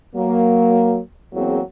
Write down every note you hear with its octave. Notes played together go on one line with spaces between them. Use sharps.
F#3 A#3
E2 F#3 A#3 C4 G#4